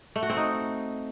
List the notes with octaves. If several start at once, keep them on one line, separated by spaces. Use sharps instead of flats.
A3
F#4
C4
D#4